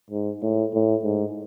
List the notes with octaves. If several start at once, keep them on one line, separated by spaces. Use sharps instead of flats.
G#2
A2
A2
G#2